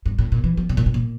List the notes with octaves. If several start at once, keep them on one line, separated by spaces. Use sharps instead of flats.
G2
A2
A#2
E3
F3
C3
A#2
A2
A#2